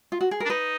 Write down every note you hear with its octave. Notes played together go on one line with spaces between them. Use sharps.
F4
F#4
G#4
A#4
D4
D#4 B4